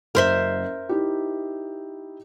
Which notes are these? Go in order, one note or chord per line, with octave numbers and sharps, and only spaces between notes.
F#1 F#2 A#4 C5 E5
D#4 E4 G4